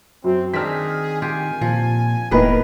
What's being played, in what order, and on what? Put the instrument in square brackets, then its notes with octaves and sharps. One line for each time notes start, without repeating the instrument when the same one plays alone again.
[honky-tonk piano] F#2 [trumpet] C4
[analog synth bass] D#3 [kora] C4 D4 D#4 [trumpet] G#4 [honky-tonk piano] F6 B6
[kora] F4 G4 [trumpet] G#5
[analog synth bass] A#2 [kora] F3
[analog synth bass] E1 [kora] A2 D#3 B4 [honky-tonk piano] A#3 B3 D#4 [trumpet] A#4